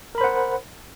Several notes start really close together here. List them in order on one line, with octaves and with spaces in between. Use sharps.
A#4 B5 C5 F#5